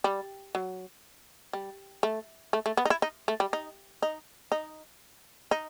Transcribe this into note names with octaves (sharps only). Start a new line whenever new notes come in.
G3
F#3
G3
A3
A3
A3
B3
D#4
E4
D#4
A3
G3
D#4
D#4
D#4
D#4